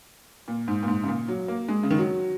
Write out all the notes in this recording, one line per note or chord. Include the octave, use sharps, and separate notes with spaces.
A#2
G#2
A#2
G#2
C#3
A#2
F#3
A#3
G#3
C#3
D#3
F#3